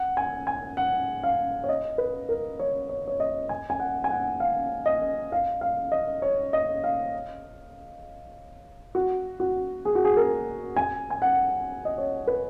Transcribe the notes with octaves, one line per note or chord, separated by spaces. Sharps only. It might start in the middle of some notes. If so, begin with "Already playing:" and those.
Already playing: F#5
G#5
G#5
F#5
F5
C#5
D#5
B4
A#4
C#5
C#5
C#5
D#5
G#5
G#5
F#5
G#5
F#5
F5
D#5
F5
F5
D#5
C#5
D#5
F5
F#4
F#4
G#4
F#4
G#4
A#4
G#5
G#5
F#5
D#5
C#5
B4